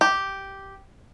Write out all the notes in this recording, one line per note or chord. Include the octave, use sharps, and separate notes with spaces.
G4